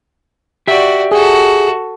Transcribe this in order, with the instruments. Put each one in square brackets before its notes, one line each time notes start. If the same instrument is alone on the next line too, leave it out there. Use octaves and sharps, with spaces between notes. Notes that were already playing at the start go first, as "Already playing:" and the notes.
[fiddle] F#4 D5 [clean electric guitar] G4 E5
[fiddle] F#4 A4 [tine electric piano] G#4